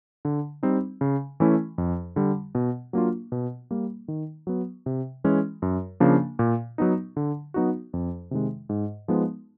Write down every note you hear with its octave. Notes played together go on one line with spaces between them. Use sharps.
D3
G3 C4 D#4
C#3
E3 A3 C#4 E4
F2
D3 G3
B2
F#3 A#3 D4 F4
B2
G3 A#3
D#3
F#3 B3
C3
E3 G#3 C#4
F#2
C#3 F3 A#3 D4
A#2
F#3 B3 D#4
D3
F#3 B3 D#4 F#4
F2
C3 D#3 G#3
G#2
F3 G#3 B3 D#4